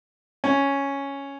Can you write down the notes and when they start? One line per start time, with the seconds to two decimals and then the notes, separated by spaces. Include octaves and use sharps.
0.44 C#4